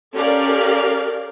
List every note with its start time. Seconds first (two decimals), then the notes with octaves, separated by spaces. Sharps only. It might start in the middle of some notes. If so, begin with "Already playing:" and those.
0.15 C#4 G4 A4 A#4 D5 F5